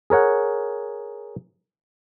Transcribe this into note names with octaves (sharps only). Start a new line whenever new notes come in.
G#4 A#4 C#5 F#5